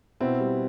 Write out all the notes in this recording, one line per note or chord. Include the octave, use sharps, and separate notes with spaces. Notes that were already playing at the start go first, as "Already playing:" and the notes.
B2 C4 E4
G3